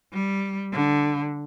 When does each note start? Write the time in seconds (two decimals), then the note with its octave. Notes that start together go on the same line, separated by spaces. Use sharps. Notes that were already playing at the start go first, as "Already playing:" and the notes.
0.13 G3
0.73 D3